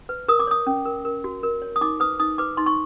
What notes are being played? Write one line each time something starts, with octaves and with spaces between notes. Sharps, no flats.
B4
A#4 D#6
D6
C#5 D#6
C#4
A#4
A#4
F#4
A#4
C#5
D#6
D#4 D6
B4 D#6
D#4 D#6
B4 D6
D#4 C6
C#6